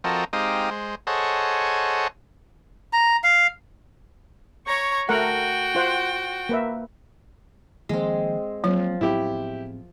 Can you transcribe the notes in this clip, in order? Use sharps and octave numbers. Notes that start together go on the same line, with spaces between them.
F3 C4 F#4 A4 A#4 D#5
G#3 C4 D#4 G4 F5 D#6
G#3 C5
G#4 A4 C5 C#5 D#5 F#5
A#5
F5
C#5 A#5 C#6
A3 F#4 A#4 F#5 G5
F4 C5 F#5
A#3 B4 E5
D#3 F3 G#3 A#3 C4
F3 F#3 A#3 C4
A2 B3 C4 E4 G4